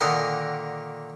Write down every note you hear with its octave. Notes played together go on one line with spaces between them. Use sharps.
A#2 D3 D#3 A#4 F#5 C6